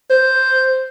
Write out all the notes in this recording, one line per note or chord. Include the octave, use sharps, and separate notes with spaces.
C5